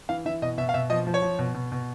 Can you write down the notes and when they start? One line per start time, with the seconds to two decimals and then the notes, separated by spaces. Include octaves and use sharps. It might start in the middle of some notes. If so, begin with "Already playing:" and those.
0.09 E3 F5
0.25 E3 E5
0.42 B2 D#5
0.58 B2 E5
0.69 F5
0.74 B2 E5
0.90 F3 D#5
1.07 F3
1.14 C#5
1.22 F3
1.39 B2
1.54 B2
1.72 B2